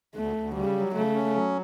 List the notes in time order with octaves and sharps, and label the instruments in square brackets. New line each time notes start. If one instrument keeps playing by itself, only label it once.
[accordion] D2 [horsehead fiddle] A3
[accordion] D2
[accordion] C#3 [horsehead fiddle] G3
[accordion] F#3
[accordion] C#3 [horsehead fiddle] A3
[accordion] C#4
F#3